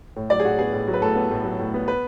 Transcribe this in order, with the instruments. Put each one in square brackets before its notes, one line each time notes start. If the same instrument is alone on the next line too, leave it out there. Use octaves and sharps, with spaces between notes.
[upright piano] A2
F#3 D5
G#4
A2 F#4
B3 G#4
A2
F#3
B4
A2 A4
B3
A2
F#3
A2
B3
B4